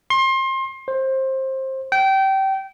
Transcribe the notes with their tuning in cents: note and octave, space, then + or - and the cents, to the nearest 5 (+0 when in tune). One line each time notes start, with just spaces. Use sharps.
C6 +30
C5 +20
G5 -25